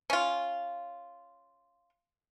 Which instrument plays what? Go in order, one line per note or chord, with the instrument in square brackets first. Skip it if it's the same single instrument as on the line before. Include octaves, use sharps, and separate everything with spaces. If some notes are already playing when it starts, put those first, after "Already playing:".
[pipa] C#4 F4